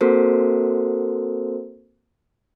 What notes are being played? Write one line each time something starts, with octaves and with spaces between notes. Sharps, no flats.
A#3 C4 F#4 A4 A#4 C5